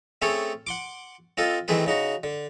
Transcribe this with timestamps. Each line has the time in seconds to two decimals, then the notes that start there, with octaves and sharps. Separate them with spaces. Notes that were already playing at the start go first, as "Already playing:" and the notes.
0.22 A3 C4 C#4 G#4 A4 C#5
0.67 F#5 C6 D6
1.37 C4 F4 A4 D#5
1.68 D#3 E3 A3 C4 G#4 B4
1.86 C#3 D#4 F#4
2.23 D3